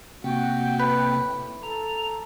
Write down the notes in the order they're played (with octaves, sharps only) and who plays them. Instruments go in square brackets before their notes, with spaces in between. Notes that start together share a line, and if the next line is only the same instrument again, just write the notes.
[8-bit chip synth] C3 A#3 C4 [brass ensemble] F#4 [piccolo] G5
[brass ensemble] A2 [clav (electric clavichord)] B4
[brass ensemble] A4 [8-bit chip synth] A#5 [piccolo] F7